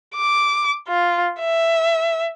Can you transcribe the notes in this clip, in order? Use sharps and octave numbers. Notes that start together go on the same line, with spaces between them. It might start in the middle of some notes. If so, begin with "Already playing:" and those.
D6
F4
E5